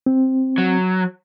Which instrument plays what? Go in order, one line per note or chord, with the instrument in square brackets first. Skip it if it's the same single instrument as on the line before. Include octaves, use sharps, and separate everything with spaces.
[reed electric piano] C4
[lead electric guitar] F#3